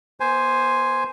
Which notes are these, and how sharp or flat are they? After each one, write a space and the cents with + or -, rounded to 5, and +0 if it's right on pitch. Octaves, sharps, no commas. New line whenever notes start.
B3 -35 C5 +0 G#5 +0